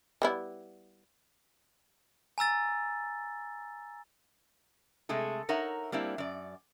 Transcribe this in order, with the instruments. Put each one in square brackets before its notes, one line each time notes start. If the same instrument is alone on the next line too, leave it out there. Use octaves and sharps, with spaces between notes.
[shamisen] G3 B3 E4
[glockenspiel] G#5 A#5 E6 A6
[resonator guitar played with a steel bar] C3 G#3 A3 G#4 A4
D#4 A#4 C#5 E5 F#5
G3 A#3 C4 D4 E4
F#2 D5